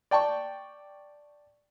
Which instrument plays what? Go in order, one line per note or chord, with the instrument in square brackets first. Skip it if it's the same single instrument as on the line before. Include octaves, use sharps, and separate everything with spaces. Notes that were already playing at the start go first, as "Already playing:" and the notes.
[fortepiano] D5 G5 A5 C#6